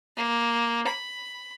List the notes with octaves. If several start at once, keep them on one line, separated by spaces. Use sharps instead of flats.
A#3
B5